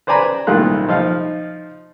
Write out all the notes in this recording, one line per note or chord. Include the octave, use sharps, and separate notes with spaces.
B4 C5 D5 G#5 A#5 B5
C2 A#2 D#3 A3 F4 F#6
F3 D#4 F5